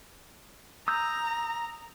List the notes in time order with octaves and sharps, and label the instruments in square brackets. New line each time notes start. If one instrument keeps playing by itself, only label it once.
[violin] A#5 [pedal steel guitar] D#6 E6 G6